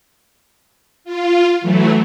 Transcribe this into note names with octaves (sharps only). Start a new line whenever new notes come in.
F4
E3 F#3 A3